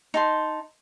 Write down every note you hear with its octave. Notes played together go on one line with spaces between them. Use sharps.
D#4 A5 C6